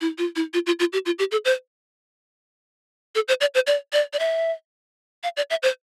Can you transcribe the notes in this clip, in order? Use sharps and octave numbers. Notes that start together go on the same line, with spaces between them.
E4
F4
E4
F4
F4
F4
G4
F4
G4
A4
C5
A4
C5
D5
C5
D5
D5
D5
E5
F5
D5
E5
C5